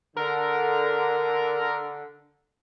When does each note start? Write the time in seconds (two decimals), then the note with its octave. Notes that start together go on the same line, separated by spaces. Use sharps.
0.17 D3 A#4